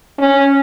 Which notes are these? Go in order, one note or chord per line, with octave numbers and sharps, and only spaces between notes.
C#4